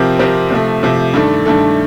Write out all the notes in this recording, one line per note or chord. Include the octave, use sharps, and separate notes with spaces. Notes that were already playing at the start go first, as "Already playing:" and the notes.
Already playing: C3 F3 C4 G4 A#4
C3 F3 C4 G4 A#4
C3 F3 A3
C3 F3 A3
G2 D#3 A3 D4 A4
G2 D#3 A3 D4 A4